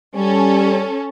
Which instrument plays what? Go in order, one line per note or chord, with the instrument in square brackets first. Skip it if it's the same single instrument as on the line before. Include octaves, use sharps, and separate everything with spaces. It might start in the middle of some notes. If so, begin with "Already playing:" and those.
[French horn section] G3 [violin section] C#4 A4